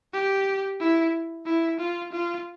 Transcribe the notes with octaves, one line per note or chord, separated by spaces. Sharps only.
G4
E4
E4
F4
F4